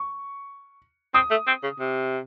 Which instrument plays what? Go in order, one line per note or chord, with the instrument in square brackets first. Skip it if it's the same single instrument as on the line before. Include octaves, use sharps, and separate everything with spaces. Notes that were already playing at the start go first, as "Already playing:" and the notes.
Already playing: [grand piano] C#6
[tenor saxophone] C4 [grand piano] D#6
[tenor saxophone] A3
C4
C#3
C3